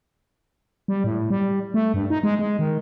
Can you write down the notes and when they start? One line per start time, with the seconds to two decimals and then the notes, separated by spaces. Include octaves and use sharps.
0.88 G3
1.04 A2
1.30 G3
1.74 A3
1.94 G2
2.10 D#4
2.23 G#3
2.39 G#3
2.59 D#3